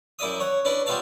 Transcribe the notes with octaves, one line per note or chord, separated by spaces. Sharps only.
F#2 E4 D5 E5 D#6
C#5 F#5
C#4 D4 E4 B4
G3 B3 F4 E5 F5 A5